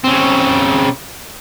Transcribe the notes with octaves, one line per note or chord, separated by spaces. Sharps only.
C#3 C4